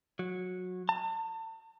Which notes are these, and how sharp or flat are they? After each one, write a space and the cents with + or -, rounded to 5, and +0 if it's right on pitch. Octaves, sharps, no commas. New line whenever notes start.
F#3 -20
A5 +40